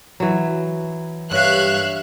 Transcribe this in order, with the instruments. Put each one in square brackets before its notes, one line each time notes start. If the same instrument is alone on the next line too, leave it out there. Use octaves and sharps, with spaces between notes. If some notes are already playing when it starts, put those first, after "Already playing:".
[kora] E3 F#3
[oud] G2 [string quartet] C#5 E5 F5 [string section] F#6